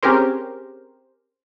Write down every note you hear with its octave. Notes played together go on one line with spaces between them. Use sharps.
C4 C#4 G4 G#4 A#4 C5